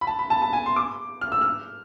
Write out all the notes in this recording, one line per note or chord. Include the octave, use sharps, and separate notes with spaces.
B5
A5
B5
A5
A5
G#5
C6
D6
F6
E6
F6